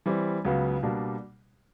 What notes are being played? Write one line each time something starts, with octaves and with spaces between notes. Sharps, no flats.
E3 G3 C4
C#2 C#3 F#3 B3
B2 G3 A#3 D4